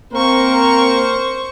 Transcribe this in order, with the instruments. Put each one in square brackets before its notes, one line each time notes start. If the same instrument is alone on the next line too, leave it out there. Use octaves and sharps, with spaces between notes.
[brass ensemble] A#3 C4 A#4 [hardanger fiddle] C5 C#6